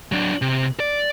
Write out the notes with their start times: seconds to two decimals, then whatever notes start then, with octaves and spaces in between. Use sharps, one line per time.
0.12 F#3 D4
0.42 C3
0.80 D5